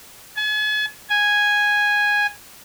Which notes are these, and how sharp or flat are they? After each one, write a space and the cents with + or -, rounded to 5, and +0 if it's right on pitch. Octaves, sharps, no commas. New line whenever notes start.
G#5 +45
G#5 -5